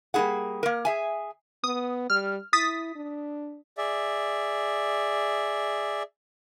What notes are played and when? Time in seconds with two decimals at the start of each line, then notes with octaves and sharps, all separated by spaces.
0.14 G3 A#3 C4 E4 G#4 F#5
0.63 A#3 A#4
0.85 G#4 E5 G#5
1.64 B3 D#6
2.10 G3 F6
2.53 E4 D#6 A6 B6
2.95 D4
3.78 G#4 D5 E5